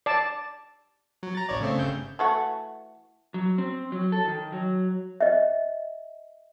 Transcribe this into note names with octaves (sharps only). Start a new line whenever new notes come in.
D5 A5
F#3
A#5 A6
A1 C#5 D5
C#3 A3 C4
G1 C#3 G6
E3 A3 F#4
F#3
C4
F#3
A4
D#3
F#3
D#5 E5